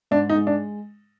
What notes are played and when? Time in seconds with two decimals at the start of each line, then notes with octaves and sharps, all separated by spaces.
0.11 G#2 D4
0.29 D#4
0.35 G#3
0.47 D4